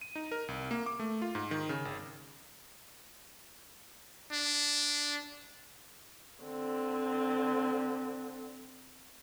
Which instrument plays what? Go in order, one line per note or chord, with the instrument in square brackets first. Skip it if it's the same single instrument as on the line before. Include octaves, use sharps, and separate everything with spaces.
[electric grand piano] D#7
D#4
A#4
C2
A#3
D6
A3
F4
G#2
D#3
C#3
G#1
[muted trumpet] D4
[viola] D3 C4